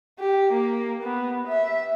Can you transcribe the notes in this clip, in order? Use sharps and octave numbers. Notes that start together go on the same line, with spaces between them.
G4
A#3
B3
E5